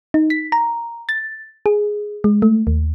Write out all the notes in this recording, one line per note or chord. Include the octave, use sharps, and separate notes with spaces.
D#4
B6
A#5
A6
G#4
G#3
A3
D#2